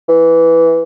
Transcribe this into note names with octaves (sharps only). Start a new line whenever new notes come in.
E3